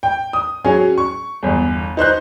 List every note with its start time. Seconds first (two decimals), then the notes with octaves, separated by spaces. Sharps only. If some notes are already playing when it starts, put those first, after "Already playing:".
0.03 G5
0.33 D#6
0.65 F#3 C#4 G#4
0.98 C#6
1.43 G1 E2
1.97 D#4 C5 F#6 G6